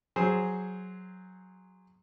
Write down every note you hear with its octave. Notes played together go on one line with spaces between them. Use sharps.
F#3 G#4 C5